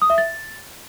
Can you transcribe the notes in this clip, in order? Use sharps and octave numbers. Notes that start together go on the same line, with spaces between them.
D#6
E5
A6